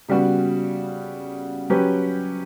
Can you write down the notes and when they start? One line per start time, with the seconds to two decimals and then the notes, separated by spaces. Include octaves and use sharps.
0.09 C#3 G3 B3 F#4
1.70 F#3 C#4 G4 B4